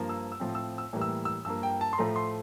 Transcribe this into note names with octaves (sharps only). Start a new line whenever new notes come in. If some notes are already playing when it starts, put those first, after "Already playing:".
Already playing: G2 F3 A#3
E6
E6
A2 F3 C4
E6
E6
A2 E3 G3 A#3
E6
E6
G2 F3 A#3 E6
G5
A5
C6
A2 F3 A3 A#5
C6